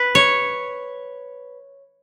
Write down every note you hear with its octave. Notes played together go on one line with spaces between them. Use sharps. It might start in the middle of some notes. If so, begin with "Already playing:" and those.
Already playing: B4
C#5